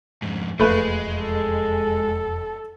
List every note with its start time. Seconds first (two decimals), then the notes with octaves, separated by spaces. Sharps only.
0.22 F2 G#2
0.60 E1 F2 G#3 A3 B4
1.21 A4